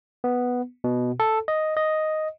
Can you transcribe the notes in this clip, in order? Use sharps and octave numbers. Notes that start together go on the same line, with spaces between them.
B3
B2
A4
D#5
D#5